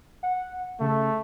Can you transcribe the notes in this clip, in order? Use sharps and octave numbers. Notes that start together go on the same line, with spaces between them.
F#5
C#3 A3